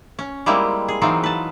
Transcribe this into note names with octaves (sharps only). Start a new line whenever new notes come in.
C#4
G3 G#3 A#3 C4 E4
G#4
E3 F#3 C4 D#4 F4
B4 A5